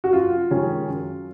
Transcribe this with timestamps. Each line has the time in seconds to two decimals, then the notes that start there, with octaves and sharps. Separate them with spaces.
0.04 F#4
0.13 F#2 F4
0.51 D#3 G#3 C#4
0.88 F#2